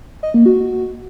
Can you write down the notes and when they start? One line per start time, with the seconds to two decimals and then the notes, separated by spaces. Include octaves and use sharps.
0.23 D#5
0.34 A#3
0.46 F#4